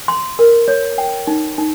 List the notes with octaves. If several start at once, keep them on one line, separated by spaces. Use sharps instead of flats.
C6
A#4
C#5
G5
D#4
D#4